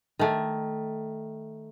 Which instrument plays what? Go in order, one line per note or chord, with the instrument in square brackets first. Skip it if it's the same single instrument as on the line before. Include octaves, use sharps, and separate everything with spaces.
[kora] D#3 A3